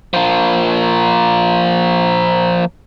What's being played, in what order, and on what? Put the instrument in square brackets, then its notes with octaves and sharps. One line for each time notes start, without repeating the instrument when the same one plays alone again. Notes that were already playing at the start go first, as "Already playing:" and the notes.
[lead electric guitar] F3 A#3